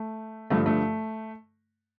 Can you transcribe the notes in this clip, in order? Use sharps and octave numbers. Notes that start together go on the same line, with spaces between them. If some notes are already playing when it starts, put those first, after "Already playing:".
Already playing: A3
G2 D3 F3 A3
A3